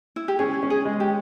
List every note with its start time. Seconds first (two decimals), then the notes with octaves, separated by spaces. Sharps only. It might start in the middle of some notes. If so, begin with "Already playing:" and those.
0.16 E4
0.28 G4
0.39 C#4 G#4
0.63 C#4
0.70 G#4
0.85 G#3
1.00 G4